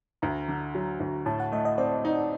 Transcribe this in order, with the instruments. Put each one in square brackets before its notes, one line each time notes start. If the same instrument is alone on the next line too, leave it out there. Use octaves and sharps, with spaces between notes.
[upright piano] D2 [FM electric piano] A#5
[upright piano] D3
F#3
D2
[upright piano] A2 [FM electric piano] A5
[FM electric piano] F#5
[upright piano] A3 [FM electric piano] D#5
[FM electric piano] D#5
[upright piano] C4 [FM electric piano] D5
[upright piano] D#4